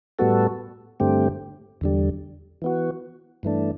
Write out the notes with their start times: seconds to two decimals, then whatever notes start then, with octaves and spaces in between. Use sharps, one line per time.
0.19 A2 G3 B3 F#4 A4
1.00 G2 D3 A3 C4 G4
1.81 E2 D3 G3
2.62 E3 B3 F#4
3.43 G2 E3 A3 D4